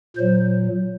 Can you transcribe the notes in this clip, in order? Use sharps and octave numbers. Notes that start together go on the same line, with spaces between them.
A#2 F#3 C5